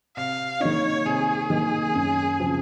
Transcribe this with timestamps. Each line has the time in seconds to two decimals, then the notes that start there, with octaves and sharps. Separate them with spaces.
0.16 C3 F5
0.60 D#3 A#3 D#4 C#5
1.05 C3 G#4
1.50 D#3 A#3 D#4
1.95 F#2
2.40 C#3 F3 C4